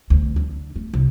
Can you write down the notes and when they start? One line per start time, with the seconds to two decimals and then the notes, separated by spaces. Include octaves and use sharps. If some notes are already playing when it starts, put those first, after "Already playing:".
0.10 D2
0.36 D3
0.76 A3
0.94 C2